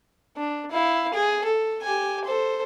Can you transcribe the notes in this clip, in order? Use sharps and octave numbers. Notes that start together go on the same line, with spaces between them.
D4
E4 F5
G#4
A4
G4 G#5
A4 C5